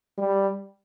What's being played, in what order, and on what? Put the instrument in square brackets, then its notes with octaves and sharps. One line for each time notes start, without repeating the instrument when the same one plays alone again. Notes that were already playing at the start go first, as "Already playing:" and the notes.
[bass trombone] G3